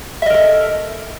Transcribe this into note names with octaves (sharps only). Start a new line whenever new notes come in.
A4 A#4 D#5 E5